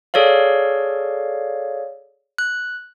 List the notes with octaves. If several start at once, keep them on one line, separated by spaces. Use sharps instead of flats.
G#4 A4 C#5 D5 F5
F#6